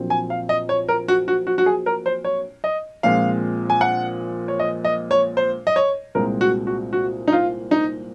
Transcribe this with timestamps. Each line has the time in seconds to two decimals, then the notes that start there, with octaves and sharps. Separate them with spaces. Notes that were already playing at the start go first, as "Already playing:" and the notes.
Already playing: A#1 A#2 F#3 C4
0.10 G#5
0.30 F5
0.49 D#5
0.69 C#5
0.89 A#4
1.08 F#4
1.28 F#4
1.47 F#4
1.58 F#4
1.66 G#4
1.86 A#4
2.06 C5
2.24 C#5
2.64 D#5
3.03 A#1 A#2 G#3 C4 F5
3.70 G#5
3.81 F#5
4.48 C#5
4.60 D#5
4.85 D#5
5.11 C#5
5.37 C5
5.67 D#5
5.76 C#5
6.15 C2 A#2 G#3 C4 A#4
6.41 F#4
6.67 F#4
6.93 F#4
7.28 D#4
7.32 F4
7.71 D#4